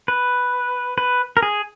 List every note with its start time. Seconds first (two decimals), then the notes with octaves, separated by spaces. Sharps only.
0.08 B4
0.98 B4
1.37 A#4
1.43 G#4